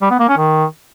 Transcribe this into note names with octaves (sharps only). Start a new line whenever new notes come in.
G3
B3
A#3
C#4
D#3